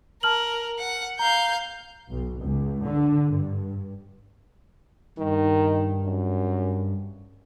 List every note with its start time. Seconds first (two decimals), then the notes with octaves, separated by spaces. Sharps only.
0.23 A#4 A5 F6 F#7
0.79 F#5
1.19 F5 A#5 G6
2.09 B1
2.40 C#2
2.83 D3
3.32 G2
5.18 G2 D#3
6.04 F#2